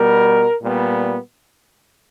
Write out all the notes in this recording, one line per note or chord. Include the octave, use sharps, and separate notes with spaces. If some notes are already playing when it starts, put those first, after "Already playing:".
Already playing: B2 G3 B3 A#4
A#2 G3 B3